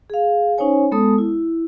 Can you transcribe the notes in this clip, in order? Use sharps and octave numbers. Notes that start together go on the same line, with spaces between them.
G#4 F5
C#4 D#4 C5 C#5 G#5
G#3 B3 A4 A5 D#6
E4